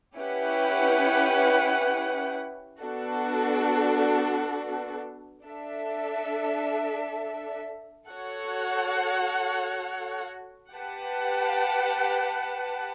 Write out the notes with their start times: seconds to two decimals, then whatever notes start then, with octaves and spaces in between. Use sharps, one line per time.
0.18 C#4 E4 G4 B4 F#5
2.82 B3 D4 F#4 A4
5.46 D4 A4 E5
8.09 F#4 A4 C#5 F#5
10.74 G4 B4 F#5 A5